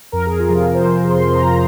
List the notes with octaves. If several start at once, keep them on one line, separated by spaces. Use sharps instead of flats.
F2 A#4
G#4
F4
C3 F3 G#4
C5
F2 A#4
C6
C3 F3 C6
A#5